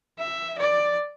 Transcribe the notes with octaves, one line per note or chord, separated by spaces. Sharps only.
E5
D5